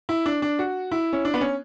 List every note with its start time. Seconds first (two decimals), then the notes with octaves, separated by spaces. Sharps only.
0.09 E4
0.26 D4
0.42 D4
0.59 F#4
0.92 E4
1.13 C#4
1.25 D4
1.34 B3
1.41 C#4